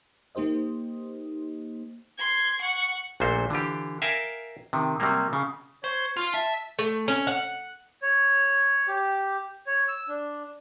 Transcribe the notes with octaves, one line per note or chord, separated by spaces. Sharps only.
A#3 D#4 G4 C5 D#5
C6 G#6
F#5 C#6
A#1 A#2 A3 A#3 F#4 C5
D3 E3 F4 G4
A#4 E5 F5 G5 G#5 A#5
C3 D#3
C3 F#3 G3 A#3
C#3
C5 C#5
F4
E5 A5
A3
C#4
F#5
C#5
G4
C#5
E6
D4